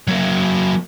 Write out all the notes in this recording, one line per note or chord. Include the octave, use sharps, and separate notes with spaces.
F#3 A#3